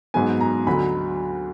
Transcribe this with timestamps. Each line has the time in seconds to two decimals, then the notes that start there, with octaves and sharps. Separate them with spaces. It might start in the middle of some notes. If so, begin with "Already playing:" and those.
0.14 G#2 F#3 B3 G#5
0.41 A#5
0.67 D2 D3 F#3 B5